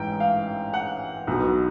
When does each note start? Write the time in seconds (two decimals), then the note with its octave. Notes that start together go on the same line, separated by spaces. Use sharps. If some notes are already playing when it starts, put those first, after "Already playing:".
Already playing: A1 G#2 E3 G5
0.20 F5
0.74 F#5
1.27 B1 B2